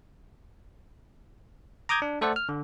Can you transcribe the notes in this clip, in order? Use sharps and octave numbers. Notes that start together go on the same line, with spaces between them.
A#5 D6 D#6 G6 G#6
D4
A3 A4 C5 D5 F#5
F6
D3